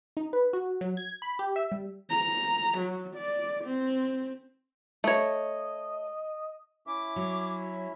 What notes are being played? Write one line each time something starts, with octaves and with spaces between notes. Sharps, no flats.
D#4
B4
F#4
F#3
G#6
B5
G4
E5
G3
A#5
F#3
D5
C4
A3 C#5 D#5
C#4 E4 E5 D6
F#3